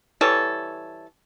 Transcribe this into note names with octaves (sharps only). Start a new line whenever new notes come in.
E3 G3 A4 C#5